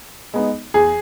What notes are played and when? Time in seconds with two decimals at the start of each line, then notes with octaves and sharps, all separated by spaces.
0.34 G#3 B3 D#4
0.74 E2 G#4